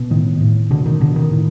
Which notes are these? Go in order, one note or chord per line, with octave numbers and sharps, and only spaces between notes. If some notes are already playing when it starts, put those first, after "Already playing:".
Already playing: B2
A2 D#3
A2
B2 D3
D#3
B2 D3
D#3
A2